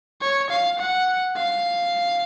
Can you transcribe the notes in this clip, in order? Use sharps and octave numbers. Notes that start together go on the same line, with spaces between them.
C#5
F5
F#5
F5